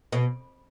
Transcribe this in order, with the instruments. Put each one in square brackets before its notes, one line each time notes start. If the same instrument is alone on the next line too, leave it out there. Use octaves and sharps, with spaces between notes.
[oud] B2